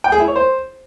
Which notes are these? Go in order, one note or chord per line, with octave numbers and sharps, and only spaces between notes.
G5
G#4
E4
C#5
C5